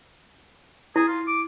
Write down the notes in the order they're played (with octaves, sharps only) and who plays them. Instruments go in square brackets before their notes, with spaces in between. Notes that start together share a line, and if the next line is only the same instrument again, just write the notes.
[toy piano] E4 [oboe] G#4
[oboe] F4
D6